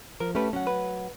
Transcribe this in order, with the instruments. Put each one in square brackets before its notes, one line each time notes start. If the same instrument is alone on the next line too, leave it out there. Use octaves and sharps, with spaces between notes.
[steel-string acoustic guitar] F3 [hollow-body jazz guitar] A#4
[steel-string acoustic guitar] A3 [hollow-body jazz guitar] C#4 G4 B4
[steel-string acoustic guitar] F#3 F#5 [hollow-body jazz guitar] C#4
[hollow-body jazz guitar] B4